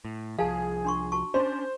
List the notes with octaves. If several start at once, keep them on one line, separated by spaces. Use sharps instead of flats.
A2
C2 F3 G#4 F5 A5
D4 C6 C#6
F#4 A5 C#6
C#4 D4 C5 C6